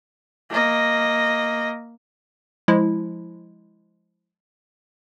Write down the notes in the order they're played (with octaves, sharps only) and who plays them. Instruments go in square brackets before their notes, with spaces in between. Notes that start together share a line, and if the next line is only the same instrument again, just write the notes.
[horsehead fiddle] A#3 D#5
[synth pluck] F3 G#3 E4